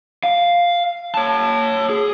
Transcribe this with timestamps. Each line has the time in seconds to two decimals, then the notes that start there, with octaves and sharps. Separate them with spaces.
0.23 F5
1.15 C#5 A5
1.89 G#4